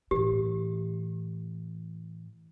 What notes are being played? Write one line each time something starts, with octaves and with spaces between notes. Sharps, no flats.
A2 E3 G4